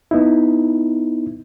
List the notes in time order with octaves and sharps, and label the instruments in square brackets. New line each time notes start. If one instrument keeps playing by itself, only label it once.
[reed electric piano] B3 D#4 E4